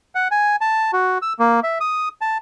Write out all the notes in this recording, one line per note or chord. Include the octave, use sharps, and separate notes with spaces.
F#5
G#5
A5
F#4
E6
A#3
E5
D#6
A5